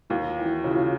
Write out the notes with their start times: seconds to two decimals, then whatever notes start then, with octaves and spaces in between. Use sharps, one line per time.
0.10 D#2 E4 F#4
0.29 F4
0.38 E3
0.46 E4 F#4
0.64 C#3 F4
0.71 E4
0.78 F4